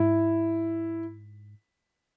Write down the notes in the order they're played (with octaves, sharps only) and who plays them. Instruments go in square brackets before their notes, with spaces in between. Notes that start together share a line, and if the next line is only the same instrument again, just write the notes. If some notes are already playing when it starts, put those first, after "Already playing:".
Already playing: [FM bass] G#2 [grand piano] E4